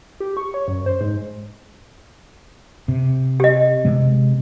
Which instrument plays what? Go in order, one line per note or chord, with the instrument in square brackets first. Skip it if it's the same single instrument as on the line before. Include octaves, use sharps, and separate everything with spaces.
[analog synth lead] G4
C#6
C#5
F#2
C5
G#2
[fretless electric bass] C3
[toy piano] G4 D#5
[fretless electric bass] C3 G#3 B3